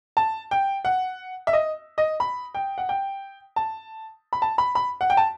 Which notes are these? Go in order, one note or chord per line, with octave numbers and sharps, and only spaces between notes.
A5
G5
F#5
E5
D#5
D#5
B5
G5
F#5
G5
A5
B5
A5
B5
B5
F#5
G5
A5